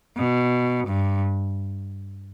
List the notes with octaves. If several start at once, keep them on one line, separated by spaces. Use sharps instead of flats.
B2
G2